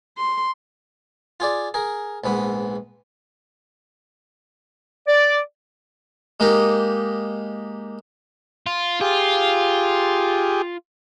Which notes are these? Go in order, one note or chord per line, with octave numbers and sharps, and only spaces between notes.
C6
F4 G#4 D5
G#4 A#4
A#1 G#2 B3 B4
D5
G#3 A#3 D#4 G4
F4
F4 G4 G#4